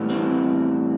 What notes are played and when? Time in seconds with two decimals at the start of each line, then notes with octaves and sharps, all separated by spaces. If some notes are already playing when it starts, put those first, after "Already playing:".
Already playing: A2 E3 G3 B3
0.10 C4